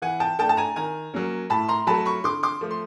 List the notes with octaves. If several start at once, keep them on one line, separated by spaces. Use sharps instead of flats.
E3 F#5 G#5
G5 A5
A3 D4 G5 A5
A5
G#5 A#5
D#3 G#5 A#5
F#3 A#3 C#4
A2 A5 B5
A#5 C6
F#3 A3 A5 B5
B5 C#6
D3 C6 D6
C6 D6
F3 A3
C6